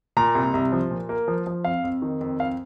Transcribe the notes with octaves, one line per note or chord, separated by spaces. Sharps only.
A#2 A#5
C2
C2
F3
A#2
A#3
F3
F3
F2 F5
F2
D#3
F2
F2 F5